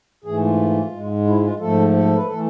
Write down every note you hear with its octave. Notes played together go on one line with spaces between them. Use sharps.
G#2 E3 A3 G#4
F4
G#2 G#3
E4
F4
G#2 F3 A3 A4
A4
B4
E3 A3 A4